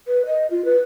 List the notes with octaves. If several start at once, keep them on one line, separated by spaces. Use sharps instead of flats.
B4
D#5
F4
B4